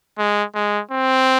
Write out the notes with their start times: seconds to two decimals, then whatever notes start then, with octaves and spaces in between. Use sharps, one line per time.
0.18 G#3
0.55 G#3
0.91 C4